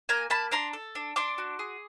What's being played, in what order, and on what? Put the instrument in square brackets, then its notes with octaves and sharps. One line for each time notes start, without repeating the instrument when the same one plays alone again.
[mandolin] A#3 G#5 A#5
A#3 A5 B5
D4 A#5 C6
A4
D4
D4 C6 D6
F#4
G#4